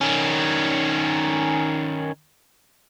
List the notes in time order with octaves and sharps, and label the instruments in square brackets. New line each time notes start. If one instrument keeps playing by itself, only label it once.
[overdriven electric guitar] D#3 C#4